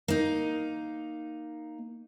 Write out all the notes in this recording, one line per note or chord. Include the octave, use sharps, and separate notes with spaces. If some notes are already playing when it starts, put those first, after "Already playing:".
A#3 D#4